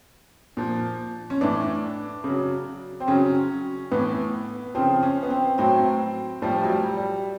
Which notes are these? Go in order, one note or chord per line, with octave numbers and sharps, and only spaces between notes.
A#2 F3
C#4
A2 E3 D4
C#3 F#3
C4
C#3 F#3 C#4
A2 E3 B3
C#3 F3 C4
C#4
B3
C4
A2 F#3 C4
A2 F3 G3
F#3
G3
G3